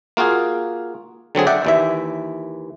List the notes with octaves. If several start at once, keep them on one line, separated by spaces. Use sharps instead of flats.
A#3 F4 F#4 G#4
D3 F#3 C4 G#4
D5 E5 F#5 G5
D#2 E3 E5